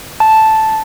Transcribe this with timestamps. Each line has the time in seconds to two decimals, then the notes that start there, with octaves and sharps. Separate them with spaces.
0.20 A5